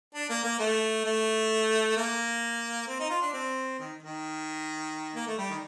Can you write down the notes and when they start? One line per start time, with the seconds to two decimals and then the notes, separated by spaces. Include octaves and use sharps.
0.14 D4
0.29 A#3
0.44 A#3
0.59 A3
1.04 A3
1.97 A#3
2.88 C4
3.00 D#4
3.10 F4
3.21 D4
3.33 C4
3.79 D#3
4.03 D#3
5.16 A#3
5.27 A3
5.38 G3
5.50 D#3